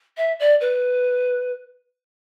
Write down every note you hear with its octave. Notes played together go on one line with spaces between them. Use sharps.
E5
D5
B4